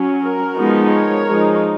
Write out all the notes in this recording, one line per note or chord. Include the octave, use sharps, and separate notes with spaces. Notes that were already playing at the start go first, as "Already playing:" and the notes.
Already playing: F#3 C#4
F#4 A#4
F3 G#3 B3 D#4
A#4 C#5
F3 G#3 D#4